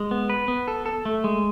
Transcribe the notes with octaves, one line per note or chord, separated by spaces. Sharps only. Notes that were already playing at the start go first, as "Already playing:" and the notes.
Already playing: G#3
B3
B4
B3
A4
A4
A3
G#3